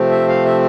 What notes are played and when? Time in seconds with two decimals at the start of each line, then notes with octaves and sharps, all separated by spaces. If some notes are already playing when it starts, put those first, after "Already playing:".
Already playing: C3 F3 A3 C4
0.11 E5
0.28 F5
0.45 E5